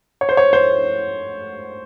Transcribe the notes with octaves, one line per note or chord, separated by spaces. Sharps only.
C#5
C5
C#5
C5